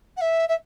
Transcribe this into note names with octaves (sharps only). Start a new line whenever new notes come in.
F#5
E5
E5